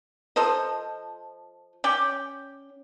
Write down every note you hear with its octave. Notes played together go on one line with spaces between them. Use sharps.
F3 A4 C5 D#5
C#4 D5 G5